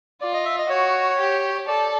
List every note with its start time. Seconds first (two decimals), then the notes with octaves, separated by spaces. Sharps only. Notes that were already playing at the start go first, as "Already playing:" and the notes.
0.21 F4 D5
0.34 D#5
0.45 E5
0.58 D#5
0.70 F#4 C#5
1.19 G4
1.68 A4 D5